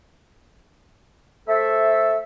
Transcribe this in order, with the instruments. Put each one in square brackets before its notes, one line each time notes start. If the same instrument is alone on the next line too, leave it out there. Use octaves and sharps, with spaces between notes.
[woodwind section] A3 A4 C5 E5